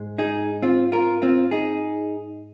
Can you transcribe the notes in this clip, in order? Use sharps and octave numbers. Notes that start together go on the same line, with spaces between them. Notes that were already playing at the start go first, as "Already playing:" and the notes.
Already playing: G#2 G#3
D#4 G#4
C4 F4
F4 A#4
C4 F4
D#4 G#4